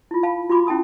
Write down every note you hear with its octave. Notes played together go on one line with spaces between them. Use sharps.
E4 F4
F5 A5 B5
F4 F#4 B5 D6
C#4 E4 G5 A5 D#6